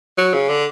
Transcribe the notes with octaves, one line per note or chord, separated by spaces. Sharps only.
F#3
C#3
D3